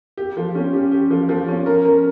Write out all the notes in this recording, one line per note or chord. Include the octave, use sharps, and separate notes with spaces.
G4
F3
C#4
G4
G4
F3
F3
C#4
A#4
A#4